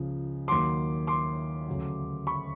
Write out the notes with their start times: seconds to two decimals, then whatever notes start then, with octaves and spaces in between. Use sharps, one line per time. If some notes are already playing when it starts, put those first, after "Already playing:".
Already playing: C#2 C#3 F3
0.48 D#2 D#3 F#3 C6 D6
1.07 C6 D6
1.67 D2 C#3 F#3
2.27 B5 C#6